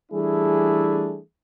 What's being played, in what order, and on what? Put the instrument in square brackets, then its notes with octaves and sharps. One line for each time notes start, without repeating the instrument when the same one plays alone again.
[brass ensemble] E3 G3 A3 D4 E4 G#4